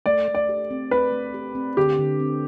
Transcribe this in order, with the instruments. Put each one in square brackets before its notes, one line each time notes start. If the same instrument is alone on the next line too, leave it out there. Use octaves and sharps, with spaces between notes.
[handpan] A3 [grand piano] D5
[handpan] A3
[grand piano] D5
[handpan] G4
C4
[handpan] A3 [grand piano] B4
[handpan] A3
G4
C4
[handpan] D3 [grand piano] G4
[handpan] D3
C4